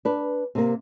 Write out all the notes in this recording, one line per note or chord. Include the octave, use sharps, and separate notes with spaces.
D4 B4
C3 A#3